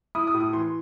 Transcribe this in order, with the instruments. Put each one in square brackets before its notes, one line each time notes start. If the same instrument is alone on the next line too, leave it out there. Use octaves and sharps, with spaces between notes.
[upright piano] E4 D#6
D#6
A2
D#6
E3 C6